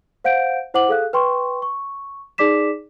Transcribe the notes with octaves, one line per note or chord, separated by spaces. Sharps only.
C5 F5 F#5 G6 D7
E4 C5 F#5 D6 F#7
G#4 A4 F5 F#6
B4 G5 C6 C#6
C#6
D#4 G#4 D5 D6 B6 E7